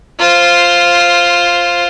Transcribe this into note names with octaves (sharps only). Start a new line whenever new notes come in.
F4 C5